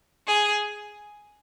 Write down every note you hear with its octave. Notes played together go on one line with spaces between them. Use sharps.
G#4